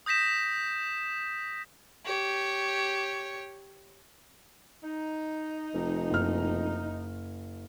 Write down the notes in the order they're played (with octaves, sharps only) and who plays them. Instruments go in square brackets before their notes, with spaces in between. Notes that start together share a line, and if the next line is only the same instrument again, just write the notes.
[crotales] D#6 G6 A#6 B6 E7
[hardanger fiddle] G4 C#5
[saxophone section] D#4
[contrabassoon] F1
[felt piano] F#1 F6